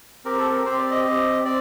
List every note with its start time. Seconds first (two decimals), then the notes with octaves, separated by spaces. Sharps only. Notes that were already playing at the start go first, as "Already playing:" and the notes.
0.25 C4 G4 A#4
0.38 A4
0.52 A#4
0.65 C4 G4 C5
0.79 D5
0.91 D#5
1.05 C4 G4
1.44 C4 D5